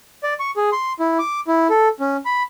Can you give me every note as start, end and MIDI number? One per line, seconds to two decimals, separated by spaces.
0.24 0.34 74
0.40 0.51 85
0.57 0.70 68
0.72 0.93 84
1.00 1.18 64
1.19 1.40 86
1.48 1.67 64
1.70 1.88 69
2.00 2.17 61
2.25 2.43 83